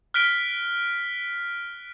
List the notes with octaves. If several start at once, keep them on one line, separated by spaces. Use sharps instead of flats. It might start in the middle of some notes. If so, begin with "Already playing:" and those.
F6 F#6 B6 D7 G7